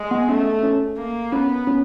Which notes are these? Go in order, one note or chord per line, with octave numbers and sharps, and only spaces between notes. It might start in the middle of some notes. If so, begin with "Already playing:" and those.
Already playing: G#3
B3
A3 C#4
C#4
A#3
B3 C#4
C#4